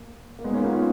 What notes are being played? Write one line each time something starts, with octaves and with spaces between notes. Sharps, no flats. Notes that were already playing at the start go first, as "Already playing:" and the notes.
Already playing: A#3
A#3
G#3 B3
D#4
A#3 C#4
F4
B3 D#4
C#4 F4